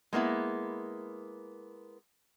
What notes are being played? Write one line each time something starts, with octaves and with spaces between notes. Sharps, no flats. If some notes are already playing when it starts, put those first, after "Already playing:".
G#3 A#3 B3 E4